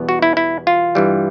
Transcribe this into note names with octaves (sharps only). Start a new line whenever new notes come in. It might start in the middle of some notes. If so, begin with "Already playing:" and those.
Already playing: E2 B2 G3 B3
F#4
E4
E4
F4
G2 E3 G3